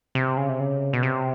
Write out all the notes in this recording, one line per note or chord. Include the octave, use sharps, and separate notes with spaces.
C3
C#3
C3
C#3
B2
C3